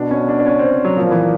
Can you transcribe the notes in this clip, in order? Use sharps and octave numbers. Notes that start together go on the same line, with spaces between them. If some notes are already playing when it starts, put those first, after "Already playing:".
Already playing: B2 D4
C#4
D4
D4
C#4
C4
F#3
A#2 F3
E3